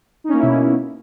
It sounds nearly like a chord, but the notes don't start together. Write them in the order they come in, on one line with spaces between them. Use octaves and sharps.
D#4 C#4 A#3 E4 B2